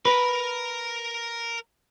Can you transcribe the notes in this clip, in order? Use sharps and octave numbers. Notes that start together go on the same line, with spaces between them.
A#4 B4 A#5